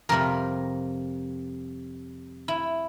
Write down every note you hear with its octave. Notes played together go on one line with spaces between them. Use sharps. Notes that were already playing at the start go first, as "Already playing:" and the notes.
F2 C3 G3 A#4
E4